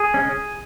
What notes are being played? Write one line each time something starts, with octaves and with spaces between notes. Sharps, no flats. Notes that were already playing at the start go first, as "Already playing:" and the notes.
Already playing: G#4
C#3 G#3 C#4